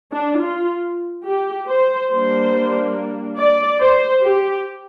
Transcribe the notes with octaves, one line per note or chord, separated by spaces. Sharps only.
D4
F4
G4
C5
G3 A#3 D4 C5
D5
C5
G4